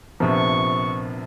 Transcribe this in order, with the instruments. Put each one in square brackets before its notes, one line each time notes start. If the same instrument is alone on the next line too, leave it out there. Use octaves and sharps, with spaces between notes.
[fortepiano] A#1 B3 [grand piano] C3 F3 [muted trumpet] C#6